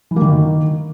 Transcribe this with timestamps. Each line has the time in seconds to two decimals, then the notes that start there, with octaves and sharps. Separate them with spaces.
0.11 E3
0.16 A#3
0.22 D#3